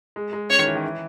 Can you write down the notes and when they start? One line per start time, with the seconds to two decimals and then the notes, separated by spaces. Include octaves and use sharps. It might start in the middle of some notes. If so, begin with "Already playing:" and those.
0.16 G#3
0.33 G#3
0.50 C#4 C#5
0.59 D#3
0.67 E3
0.75 D#3
0.84 E3